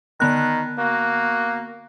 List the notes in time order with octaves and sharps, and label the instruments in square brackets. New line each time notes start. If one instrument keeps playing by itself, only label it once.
[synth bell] D3 B3 F#6 [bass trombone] D#3 [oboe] A#5
[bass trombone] A#3 [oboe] F#4